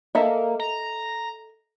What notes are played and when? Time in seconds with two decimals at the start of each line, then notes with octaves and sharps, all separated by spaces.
0.15 A#3 A4 D#5 E5
0.60 A#5